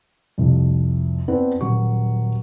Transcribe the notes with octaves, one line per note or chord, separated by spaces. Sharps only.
C2 F2
B3 C4 D4 E4 B4
D#1 F#3 C#6